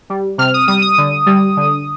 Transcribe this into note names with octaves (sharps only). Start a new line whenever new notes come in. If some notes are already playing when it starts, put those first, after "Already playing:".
G3
C3 F6
D#6
G3 D#6
D#6
D3
G3
D3